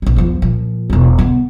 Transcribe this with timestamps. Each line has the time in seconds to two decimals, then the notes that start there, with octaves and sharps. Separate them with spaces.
0.02 A#1 C4
0.16 E2 F3
0.42 A#2 F3
0.90 E1 C#2
1.19 D3 B3